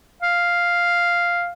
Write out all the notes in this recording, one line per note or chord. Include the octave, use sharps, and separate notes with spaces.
F5